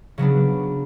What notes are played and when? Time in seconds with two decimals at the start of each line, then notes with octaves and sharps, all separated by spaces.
0.18 C#3 F#3 B3 D4